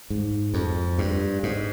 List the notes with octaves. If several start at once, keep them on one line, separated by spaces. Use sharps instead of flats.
G#2
F2
G2
G#2